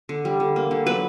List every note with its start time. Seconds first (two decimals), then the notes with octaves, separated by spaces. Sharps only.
0.09 D3
0.25 G3
0.40 D3
0.56 A#3
0.71 D3
0.86 F#3 B4